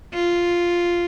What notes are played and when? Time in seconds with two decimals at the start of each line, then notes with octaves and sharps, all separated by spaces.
0.14 F4